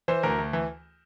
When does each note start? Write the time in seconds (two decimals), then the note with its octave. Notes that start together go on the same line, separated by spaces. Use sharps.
0.08 E3 C5
0.23 D2 A#4
0.38 D2
0.53 E3